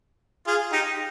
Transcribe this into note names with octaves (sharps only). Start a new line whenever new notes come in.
F4 G#4
D#4 G4